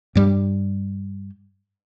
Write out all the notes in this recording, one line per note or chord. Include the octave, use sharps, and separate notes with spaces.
G2 G3